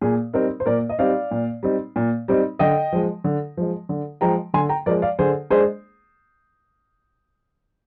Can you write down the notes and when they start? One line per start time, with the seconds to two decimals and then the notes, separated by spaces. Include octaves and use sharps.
0.01 A#2 G#4
0.33 G3 C4 D#4 A#4
0.60 C5
0.66 A#2 A#4 D5
0.89 D#5
0.99 G3 C4 D#4 D5 F5
1.31 A#2
1.63 G3 C4 D#4
1.96 A#2
2.28 G3 C4 D#4
2.59 D3 D#5 G5
2.92 F3 G#3
3.24 D3
3.57 F3 G#3
3.89 D3
4.21 F3 G#3 G5 A#5
4.54 D3 G#5 C6
4.69 G5 A#5
4.86 F3 G#3 A#4 D5
5.02 D5 F5
5.19 D3 G#4 C5
5.50 G#3 D4 G#4 C5